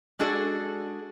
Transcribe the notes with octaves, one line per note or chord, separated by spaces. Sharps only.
G#3 D4 F#4 G#4 A4 D5